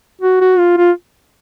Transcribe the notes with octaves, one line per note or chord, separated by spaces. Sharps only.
F#4
F#4
F4
F4